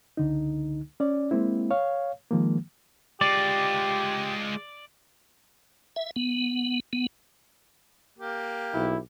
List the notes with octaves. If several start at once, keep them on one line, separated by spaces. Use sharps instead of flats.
C#2 D3 D#4
C#4 D5
G#3 A#3 C4 E4
C#5 F5
D#3 F3 G#3 A#3
G#3 F4 G4 D5
E5
B3
B3
A#3 G4
B1 E4